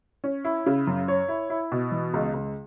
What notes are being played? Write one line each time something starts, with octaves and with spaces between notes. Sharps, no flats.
C#4
E4
C#3
F#2
C#5
E4
E4
B2
E3
C#2
C#2